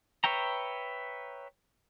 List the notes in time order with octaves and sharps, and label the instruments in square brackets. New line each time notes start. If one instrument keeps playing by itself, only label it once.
[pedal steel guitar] B4 C#5 E5 G5 A#5